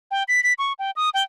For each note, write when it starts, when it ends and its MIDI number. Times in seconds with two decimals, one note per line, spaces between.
0.11 0.23 79
0.28 0.43 95
0.44 0.53 95
0.59 0.73 85
0.79 0.91 79
0.96 1.09 87
1.14 1.23 79